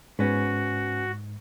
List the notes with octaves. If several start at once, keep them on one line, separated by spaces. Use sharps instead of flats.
G#2 B3 C#4 F#4